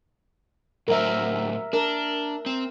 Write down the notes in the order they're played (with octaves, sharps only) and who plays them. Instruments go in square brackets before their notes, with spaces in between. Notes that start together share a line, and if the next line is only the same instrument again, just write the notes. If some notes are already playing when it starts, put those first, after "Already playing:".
[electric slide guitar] A2 F#3 C5 [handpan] A#4 E5
[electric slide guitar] D4 [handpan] A#4
[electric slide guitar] C4